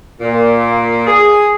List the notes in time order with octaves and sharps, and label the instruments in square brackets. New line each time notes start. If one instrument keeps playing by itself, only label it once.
[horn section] A#2
G#4